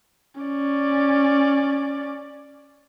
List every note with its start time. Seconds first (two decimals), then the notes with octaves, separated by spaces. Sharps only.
0.40 C#4 D5